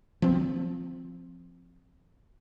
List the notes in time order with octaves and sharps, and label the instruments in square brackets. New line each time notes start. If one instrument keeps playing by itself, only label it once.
[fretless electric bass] F3 C4